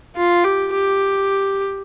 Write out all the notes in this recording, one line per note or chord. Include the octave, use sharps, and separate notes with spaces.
F4
G4
G4